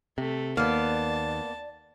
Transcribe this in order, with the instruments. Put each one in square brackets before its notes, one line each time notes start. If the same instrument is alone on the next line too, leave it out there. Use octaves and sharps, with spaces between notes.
[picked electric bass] C3 [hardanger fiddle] A3
[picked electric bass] D#2 [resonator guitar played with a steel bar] A#3 B3 [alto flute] D5 [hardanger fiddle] A5